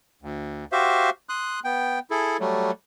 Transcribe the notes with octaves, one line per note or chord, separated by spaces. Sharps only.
D2
F#4 G4 C5 E5 F5
C6 D#6 F#6
B3 G5
E4 G#4 A4
F#3 G3 A3